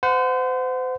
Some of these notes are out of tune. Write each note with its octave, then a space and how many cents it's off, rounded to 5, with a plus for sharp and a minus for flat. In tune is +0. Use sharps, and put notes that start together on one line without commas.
C5 -35 F#5 -15